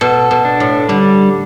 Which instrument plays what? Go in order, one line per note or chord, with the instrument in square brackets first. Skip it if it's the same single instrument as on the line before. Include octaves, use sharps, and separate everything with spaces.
[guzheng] B2 [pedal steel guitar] A4
[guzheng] B2
[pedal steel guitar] D4
[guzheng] A2
[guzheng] D3 [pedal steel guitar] G3